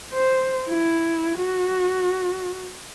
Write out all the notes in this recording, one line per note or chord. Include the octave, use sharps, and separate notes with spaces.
C5
E4
F#4